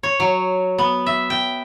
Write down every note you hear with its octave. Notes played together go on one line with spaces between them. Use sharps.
C#5
F#3
B3
E5
G5